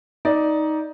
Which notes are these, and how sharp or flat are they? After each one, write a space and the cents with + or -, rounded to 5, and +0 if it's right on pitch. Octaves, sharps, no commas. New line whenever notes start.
D#4 +10 D5 +0